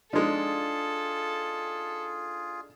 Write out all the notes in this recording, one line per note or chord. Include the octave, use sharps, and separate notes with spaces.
F3 G#3 D4 D#4 F4 G#4 A4